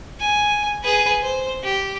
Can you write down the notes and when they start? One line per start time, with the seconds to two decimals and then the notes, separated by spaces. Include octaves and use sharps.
0.20 G#5
0.83 G#4 B4
1.22 C5
1.64 G4